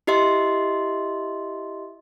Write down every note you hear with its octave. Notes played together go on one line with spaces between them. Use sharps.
E4 G4 D#5 E5 C6